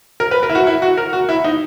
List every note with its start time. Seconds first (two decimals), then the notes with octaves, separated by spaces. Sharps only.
0.20 A#4
0.31 B4
0.43 A#4
0.50 E4
0.55 F#4
0.67 E4
0.82 F#4
0.97 A#4
1.13 F#4
1.29 E4
1.44 D#4